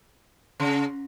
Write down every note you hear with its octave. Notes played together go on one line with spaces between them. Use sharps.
C#3